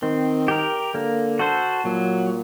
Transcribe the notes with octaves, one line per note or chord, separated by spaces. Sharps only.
D#3 C4
G4 A#4
D3 A#3
F#4 A4 C5
A#2 F#3